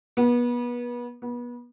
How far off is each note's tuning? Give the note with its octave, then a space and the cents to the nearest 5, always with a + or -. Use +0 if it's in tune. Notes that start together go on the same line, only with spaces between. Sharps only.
B3 -30
B3 -30